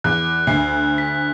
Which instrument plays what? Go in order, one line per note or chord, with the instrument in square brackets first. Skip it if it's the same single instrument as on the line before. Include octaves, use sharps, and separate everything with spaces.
[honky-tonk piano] E2 [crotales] F#6
[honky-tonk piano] D2 C7
[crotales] B6